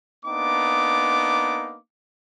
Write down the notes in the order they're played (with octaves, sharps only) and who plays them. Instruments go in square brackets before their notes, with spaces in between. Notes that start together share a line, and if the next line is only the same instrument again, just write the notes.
[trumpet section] A#3 B3 D4 D#4 D6